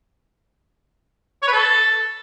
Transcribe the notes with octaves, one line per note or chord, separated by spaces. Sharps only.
C#5
B4
A4